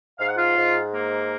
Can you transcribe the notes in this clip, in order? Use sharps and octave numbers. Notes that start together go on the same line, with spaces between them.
G#2 F5
F#5
F4 F5
G#2
A#3